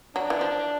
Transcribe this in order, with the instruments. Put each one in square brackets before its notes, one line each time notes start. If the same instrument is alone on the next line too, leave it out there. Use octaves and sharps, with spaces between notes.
[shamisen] F#3 [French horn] D4
[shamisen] E3
F3